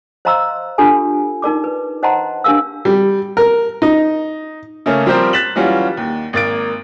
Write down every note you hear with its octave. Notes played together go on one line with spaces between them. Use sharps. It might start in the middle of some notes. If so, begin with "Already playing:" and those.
C5 D#5 F5 A#5 C6 E6
D4 F4 G4 A4 G#5
D#4 A#4 D5 D6
B4
C5 D#5 F#5 A5 A#5 C6
D4 G4 A#4 F5 E6
G3
A#4
D#4
C#3 A3 A#3 C#4
F3 G3 C4 G4 A#4 C5
F#6 A6 B6 E7 F#7
E3 F#3 G3 C#4 F4 F#4
D#2
G#1 A#3 A6 D7